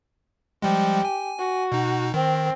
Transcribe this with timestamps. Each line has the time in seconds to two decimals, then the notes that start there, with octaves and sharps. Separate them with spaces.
0.62 F3 G3 G#3 G4
1.05 G#5
1.38 F#4
1.72 B2 D#4
2.14 D#3 C4